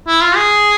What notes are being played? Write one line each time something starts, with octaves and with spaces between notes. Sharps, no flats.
E4
F4
G#4